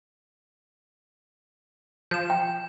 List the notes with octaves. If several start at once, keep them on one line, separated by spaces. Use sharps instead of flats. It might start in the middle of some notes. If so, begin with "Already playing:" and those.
F3 G6 E7
G5